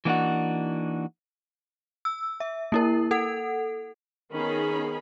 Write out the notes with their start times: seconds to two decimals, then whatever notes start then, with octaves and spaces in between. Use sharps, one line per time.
0.05 E3 A#3 B3 D4 D#4 F#4
2.05 E6
2.40 E5
2.72 A#3 E4 A#4
3.11 A4 F#5
4.33 D#3 B3 C#4 D#4 G#4 B5